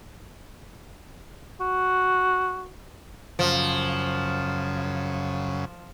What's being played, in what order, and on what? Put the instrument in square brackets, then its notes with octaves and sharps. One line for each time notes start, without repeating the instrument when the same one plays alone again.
[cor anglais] F#4
[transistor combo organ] F#2 C#3 [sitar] F3